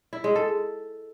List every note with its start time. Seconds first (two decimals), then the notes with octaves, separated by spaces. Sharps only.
0.13 E4
0.24 G#3
0.35 A4